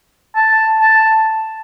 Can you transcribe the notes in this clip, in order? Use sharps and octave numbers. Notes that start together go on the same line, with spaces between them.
A5
A5